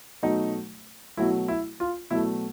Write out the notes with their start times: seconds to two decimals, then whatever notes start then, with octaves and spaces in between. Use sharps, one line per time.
0.22 B2 F#3 A3 D#4
1.17 B2 F#3 A3 E4
1.48 E4
1.80 F4
2.11 B2 F#3 A3 E4